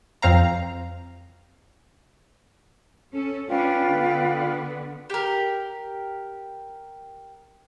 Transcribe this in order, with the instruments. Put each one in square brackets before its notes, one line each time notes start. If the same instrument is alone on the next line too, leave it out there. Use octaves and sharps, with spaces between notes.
[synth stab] F2 C4 F5 A#5
[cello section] C#4 A4
[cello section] C#4 D4 [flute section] F4 B4 G5
[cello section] D3 B3
[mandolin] G4 A#4